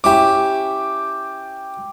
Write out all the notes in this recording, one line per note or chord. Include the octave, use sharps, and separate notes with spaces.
C#4 E4 G4 G5 D6